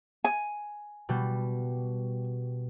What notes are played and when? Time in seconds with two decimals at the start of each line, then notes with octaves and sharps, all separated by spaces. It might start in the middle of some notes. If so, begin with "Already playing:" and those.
0.24 G#5
1.09 B2 G3